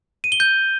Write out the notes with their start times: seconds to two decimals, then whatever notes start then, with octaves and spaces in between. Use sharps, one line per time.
0.24 D#7
0.32 G7
0.40 G6